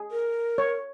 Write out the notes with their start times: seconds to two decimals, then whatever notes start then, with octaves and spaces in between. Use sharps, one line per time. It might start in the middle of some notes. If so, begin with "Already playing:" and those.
Already playing: G#4
0.11 A#4
0.58 C#5